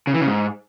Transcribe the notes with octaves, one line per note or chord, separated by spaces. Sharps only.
C#3
E3
C#3
G#2